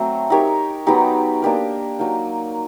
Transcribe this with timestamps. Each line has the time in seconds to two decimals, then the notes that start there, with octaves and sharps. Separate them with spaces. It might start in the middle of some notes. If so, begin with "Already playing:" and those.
Already playing: F#3 A3 C4
0.30 D#4 G4 A#4 C#5
0.86 F#3 B3 D#4 G4
1.42 A#3 D4 G4 A#4
1.99 F#3 A#3 D#4